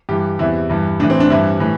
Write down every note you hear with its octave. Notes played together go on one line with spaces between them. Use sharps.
G2 E3 G4
E2 C3 E3 E4
G2 E3
A2 E3 D4
C4
D4
G2 E3 E4
A2 E3